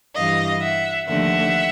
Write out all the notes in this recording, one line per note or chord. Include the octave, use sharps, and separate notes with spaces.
G2 E3 G3 D#5 F5
E5 F#5
D#2 D3 F3 A3 E5 F#5